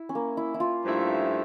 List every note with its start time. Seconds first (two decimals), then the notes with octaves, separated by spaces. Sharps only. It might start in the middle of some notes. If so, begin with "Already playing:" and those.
Already playing: E4
0.09 C#4
0.15 A#3
0.37 E4
0.54 E4
0.60 F4
0.84 G2 F3 A3 E4